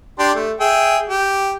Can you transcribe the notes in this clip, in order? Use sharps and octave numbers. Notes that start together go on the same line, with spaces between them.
D4 G4 C6
A3
G#4 E5 G5
G4